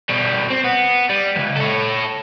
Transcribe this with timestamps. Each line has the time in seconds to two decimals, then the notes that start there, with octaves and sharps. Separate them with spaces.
0.10 B2 G3
0.50 C4
0.64 B3
1.09 G3
1.36 C#2 F#2
1.57 A4 C#5